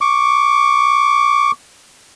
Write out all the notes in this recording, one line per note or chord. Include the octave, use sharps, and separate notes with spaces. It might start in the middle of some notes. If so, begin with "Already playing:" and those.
C#6 D6